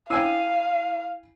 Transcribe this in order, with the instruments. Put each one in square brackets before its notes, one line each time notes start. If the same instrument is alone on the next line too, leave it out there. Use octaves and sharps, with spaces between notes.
[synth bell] E4 C7 D#7 [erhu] F5 [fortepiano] G5 G#5 E6